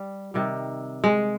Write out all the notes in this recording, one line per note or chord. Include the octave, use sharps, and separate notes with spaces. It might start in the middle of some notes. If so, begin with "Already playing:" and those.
Already playing: G3
C3 D#3 G3
G#3